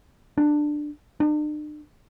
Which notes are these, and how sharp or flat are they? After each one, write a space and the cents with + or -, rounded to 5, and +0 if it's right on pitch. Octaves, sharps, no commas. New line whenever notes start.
D4 +15
D4 +45